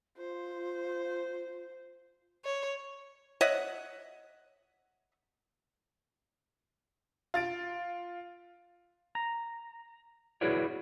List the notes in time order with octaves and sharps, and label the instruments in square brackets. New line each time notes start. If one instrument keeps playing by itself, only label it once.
[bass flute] F4 [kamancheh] C5
[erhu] C#5
[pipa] C#5 D#5 E5 F#5
[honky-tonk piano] F4 A6 D7
[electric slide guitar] A#5
E4 F#4 G#4 B4 C#5 D5